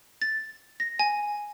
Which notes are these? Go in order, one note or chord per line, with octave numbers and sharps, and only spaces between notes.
A6
A#6
G#5